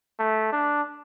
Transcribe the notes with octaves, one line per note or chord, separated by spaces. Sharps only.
A3
D4